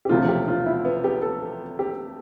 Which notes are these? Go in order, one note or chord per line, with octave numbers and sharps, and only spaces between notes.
G4
E1 D2 C3 F3 F4
G4
F4
E4
B3
G4
A4
G4